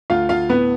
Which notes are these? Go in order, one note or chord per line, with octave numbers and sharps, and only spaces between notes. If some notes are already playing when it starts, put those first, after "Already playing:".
D2 F4 F5
D2 F4 F5
A2 B3 B4